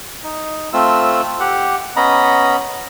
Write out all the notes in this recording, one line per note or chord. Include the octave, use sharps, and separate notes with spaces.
D#4
A3 C4 F4 E6
G4 F#5
B3 C#4 D#5 A#5 B5